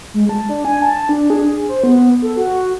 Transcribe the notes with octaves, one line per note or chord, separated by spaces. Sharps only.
G#3
A5
D4
G#5
A5
D4
G#4
C5
B3
A4
F#4